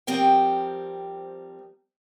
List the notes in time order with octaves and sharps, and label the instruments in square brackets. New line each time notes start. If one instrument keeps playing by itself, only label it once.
[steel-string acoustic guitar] F3 G3 C4 A#4 G5